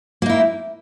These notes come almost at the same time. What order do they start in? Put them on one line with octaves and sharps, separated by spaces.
A#3 D#4 E4